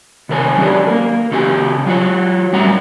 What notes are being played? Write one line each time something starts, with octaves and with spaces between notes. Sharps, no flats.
C3 D#3 A#4 B4 C#5 G#5
F#3 C#4 D4 G4 G#4
A#3 A#4
C#3 C#4 F#4 G4 C#5 G#5
F#3 F4 F#4 C#5
A2 G3 C#4 F#5 A#5